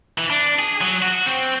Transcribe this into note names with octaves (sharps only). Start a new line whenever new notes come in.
E3
D4
G#4
F#3
F#4
C4